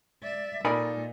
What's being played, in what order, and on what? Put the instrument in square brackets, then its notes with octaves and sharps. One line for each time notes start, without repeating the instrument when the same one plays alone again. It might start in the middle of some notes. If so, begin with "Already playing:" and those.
[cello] D5 E5
[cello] A#2 [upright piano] D#4 A4 D5 [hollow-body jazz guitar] A#4 G#5 B5